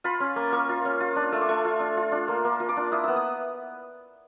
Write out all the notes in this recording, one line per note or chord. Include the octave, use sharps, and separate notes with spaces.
F4 B5
C#4
A#3
A#3 C#6
F4
C#4
F4
D4
A3
D6
A3 C#6
F4
D4
F4
D4
A#3
A#3
F4
D6
D4
E4 D#6
B3 E6
D#6